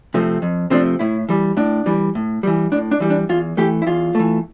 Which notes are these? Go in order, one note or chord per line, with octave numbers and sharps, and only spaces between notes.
C3 F3 A3 C4
F2
C3 F3 A3 C4 D4
A2 E4
E3 G3
A2 D4
E3 G3
A2
E3 G3
A2 D4
D4
E3 G3
D4
E2 F4
E3 A3 G4
E4
E2 F4
E3 A3